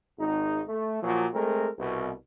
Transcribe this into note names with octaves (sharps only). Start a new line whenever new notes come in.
G#1 D#4
A3
A#2 F3 F#3
G#3 A3 C4 A#4
C2 B2